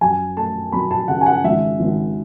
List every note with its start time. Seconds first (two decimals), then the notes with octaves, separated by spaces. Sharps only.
0.01 F#2 G#5
0.37 A3 A5
0.72 F#3 B5
0.91 A5
1.08 C#3 F#5
1.21 G#5
1.26 F#5
1.44 G#1 E5
1.80 G#1